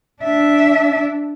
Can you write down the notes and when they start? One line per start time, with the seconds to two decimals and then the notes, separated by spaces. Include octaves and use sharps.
0.23 D4 E5